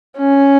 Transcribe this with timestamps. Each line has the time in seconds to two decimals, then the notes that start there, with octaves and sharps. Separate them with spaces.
0.18 C#4